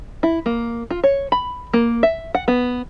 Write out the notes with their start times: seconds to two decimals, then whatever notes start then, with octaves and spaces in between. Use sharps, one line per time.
0.23 E4
0.46 A#3
0.91 F4
1.04 C#5
1.32 B5
1.73 A#3
2.03 E5
2.35 F#5
2.48 B3